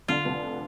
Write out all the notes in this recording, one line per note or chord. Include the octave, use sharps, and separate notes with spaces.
D3 F4
F1